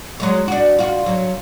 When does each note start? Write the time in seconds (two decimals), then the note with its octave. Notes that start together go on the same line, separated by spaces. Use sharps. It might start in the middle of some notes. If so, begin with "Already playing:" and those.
0.20 F#3 G#3 C#5
0.48 D4 F#4
0.79 F4 F#4
1.06 F#3